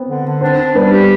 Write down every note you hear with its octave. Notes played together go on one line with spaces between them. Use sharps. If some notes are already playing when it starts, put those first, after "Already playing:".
Already playing: B3 C4
D3
D3
C4 D4 C5
D4
G3 B3 B4
G4